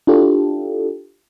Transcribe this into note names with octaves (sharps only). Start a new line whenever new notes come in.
D4 E4 F4 G4 A4